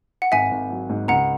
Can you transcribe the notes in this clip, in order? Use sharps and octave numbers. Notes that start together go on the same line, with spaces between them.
F#5
G#1 E5 G#5
G#1
F#3
G#2
C#2 F#5 A#5